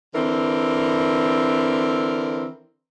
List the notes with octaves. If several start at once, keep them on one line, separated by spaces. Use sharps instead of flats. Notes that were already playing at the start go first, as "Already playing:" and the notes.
D3 E3 C4 A#4